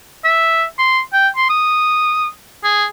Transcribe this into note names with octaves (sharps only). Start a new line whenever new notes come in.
E5
C6
G5
C6
D#6
G#4